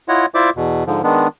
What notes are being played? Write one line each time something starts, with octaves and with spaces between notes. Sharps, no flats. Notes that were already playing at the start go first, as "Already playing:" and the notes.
E4 F4 C#5 D#5 F#5
E4 F4 C5 D5 E5 D6
E2 B2
G#2 D3 F3
D#3 G#3 B3 D4